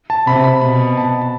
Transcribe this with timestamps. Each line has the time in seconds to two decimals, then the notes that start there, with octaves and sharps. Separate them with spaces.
0.10 A5
0.27 C3 B5
0.44 B5
0.61 B2 B5
0.97 A5
1.22 A5